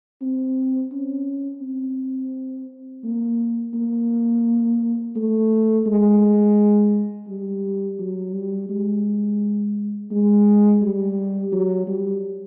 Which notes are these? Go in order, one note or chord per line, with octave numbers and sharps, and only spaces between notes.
C4
C#4
C4
A#3
A#3
A3
G#3
G3
F#3
G3
G#3
G#3
G3
F#3
G3